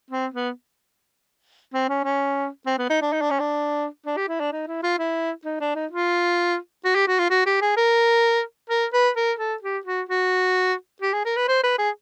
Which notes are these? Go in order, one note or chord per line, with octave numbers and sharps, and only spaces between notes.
C4
B3
C4
C#4
C#4
C4
B3
D#4
D4
D#4
D4
C#4
D4
D4
G4
E4
D4
D#4
E4
F4
E4
D#4
D4
D#4
F4
F#4
G4
F#4
F4
F#4
G4
G#4
A#4
A#4
B4
A#4
A4
G4
F#4
F#4
G4
G#4
A#4
B4
C5
B4
G#4